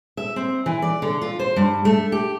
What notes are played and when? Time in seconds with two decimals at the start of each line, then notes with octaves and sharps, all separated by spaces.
0.17 E5
0.36 C4
0.66 E3
0.82 D5
1.02 D3
1.22 F4
1.39 C5
1.56 G2
1.85 A3
2.12 G4